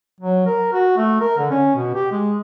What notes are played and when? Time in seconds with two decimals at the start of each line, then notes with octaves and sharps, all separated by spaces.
0.20 F#3
0.46 A#4
0.73 F#4
0.97 A3
1.20 A#4
1.38 D3
1.50 C#4
1.76 B2
1.95 G4
2.12 G#3